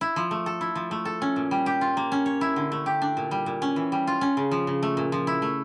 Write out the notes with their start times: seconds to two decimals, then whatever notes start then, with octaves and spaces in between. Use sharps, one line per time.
0.01 E4
0.16 F3
0.31 A3
0.46 A4
0.61 E4
0.75 F3
0.91 A3
1.05 A4
1.22 C#4
1.36 A#2
1.51 G3
1.66 G4
1.81 F4
1.97 A#3
2.12 C#4
2.26 C#5
2.41 E4
2.56 D3
2.72 A3
2.86 G4
3.02 D4
3.17 A#2
3.31 G3
3.46 A#2
3.62 C#4
3.76 E3
3.92 G3
4.07 F4
4.21 C#4
4.37 C#3
4.51 F3
4.67 C#3
4.83 A3
4.97 A#2
5.12 F3
5.27 E4
5.42 A3